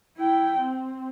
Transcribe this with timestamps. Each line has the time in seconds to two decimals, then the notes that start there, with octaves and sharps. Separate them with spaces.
0.18 E4 G5
0.59 C4